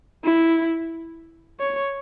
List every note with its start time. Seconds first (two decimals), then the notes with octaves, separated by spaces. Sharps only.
0.25 E4
1.60 C#5